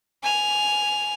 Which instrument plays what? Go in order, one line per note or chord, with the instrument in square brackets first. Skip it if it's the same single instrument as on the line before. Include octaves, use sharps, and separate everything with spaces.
[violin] G#5 F7